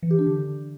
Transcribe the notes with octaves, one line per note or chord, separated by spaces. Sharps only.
E3
G4
D4
D3